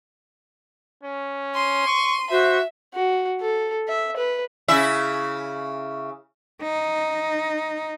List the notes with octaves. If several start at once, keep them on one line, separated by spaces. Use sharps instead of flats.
C#4
C6 D#7
C#6
F#4 C5 E5
F#4
A4
E5
B4
C#3 E4 E5
D#4